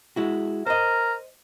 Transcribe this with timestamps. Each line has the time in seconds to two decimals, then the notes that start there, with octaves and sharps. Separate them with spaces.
0.16 G#3 E4 F#4
0.67 A#4 C5 D#5